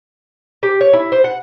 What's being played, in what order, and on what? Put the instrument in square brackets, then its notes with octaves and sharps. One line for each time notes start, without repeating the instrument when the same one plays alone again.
[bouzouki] G4
C#5
E4
C5
F#5